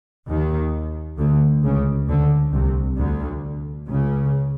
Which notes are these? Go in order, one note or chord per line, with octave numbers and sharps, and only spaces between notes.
D#2 D#3
D2 D3
C#2 C#3
D2 D3
C2 C3
D2 D3
C#2 C#3